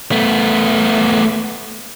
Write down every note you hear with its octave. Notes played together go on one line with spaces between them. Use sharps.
A3 B3